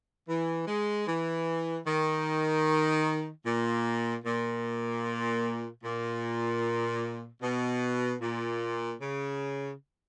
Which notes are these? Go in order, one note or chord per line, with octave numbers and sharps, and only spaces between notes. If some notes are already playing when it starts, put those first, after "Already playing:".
E3
G#3
E3
D#3
A#2
A#2
A#2
B2
A#2
C#3